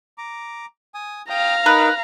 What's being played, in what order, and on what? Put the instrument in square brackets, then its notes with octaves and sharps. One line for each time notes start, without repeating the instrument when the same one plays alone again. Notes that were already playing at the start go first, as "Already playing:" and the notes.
[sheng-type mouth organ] A#5 D6
G#5 D#6
[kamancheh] F5 A#5 [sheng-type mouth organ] G5 D#6 G6
[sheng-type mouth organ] D#4 A#4 [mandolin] B4